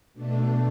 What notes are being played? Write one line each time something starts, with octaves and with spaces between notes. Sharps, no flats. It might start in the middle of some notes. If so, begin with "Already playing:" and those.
B2 A3 D4